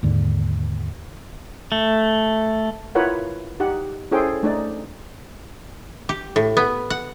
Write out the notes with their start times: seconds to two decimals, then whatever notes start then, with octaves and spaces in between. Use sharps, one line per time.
0.03 D#2 G#2 D3
1.72 A3
2.95 E4 F4 A#4 B4 C#5 F#5
3.60 D#4 G4 F#5
4.11 C#4 E4 G#4 A4 C5 G5
4.43 A3 D4 D#4 D5
6.09 G4
6.36 A2
6.57 B3
6.90 F#5